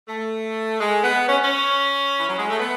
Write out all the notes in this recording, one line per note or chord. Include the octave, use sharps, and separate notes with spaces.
A3
G#3
B3
C#4
C#4
E3
F#3
G#3
A3
B3